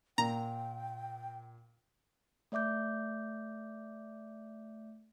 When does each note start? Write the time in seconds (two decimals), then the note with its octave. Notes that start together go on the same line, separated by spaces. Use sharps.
0.18 A#2 G5 A#5
2.52 A3 D5 E5 D6 G6